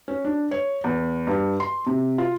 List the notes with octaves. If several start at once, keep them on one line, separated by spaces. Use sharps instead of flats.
C#4
D4
C#5
E2
G2
C6
C3
F4